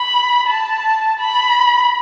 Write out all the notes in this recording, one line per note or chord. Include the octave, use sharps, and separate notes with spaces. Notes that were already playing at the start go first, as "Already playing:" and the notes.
Already playing: B5
A5
B5